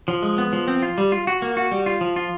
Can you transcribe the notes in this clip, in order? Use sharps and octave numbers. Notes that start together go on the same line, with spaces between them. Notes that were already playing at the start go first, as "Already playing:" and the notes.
F3
G#3
B3
F3
C4
F4
G3
F4
F#4
A#3
F#4
G3
F4
F3
F4